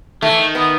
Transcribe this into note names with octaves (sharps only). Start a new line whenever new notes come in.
D#3 A3
E3
D#3
B3